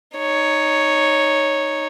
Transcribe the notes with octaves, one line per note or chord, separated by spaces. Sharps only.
D#4 C#5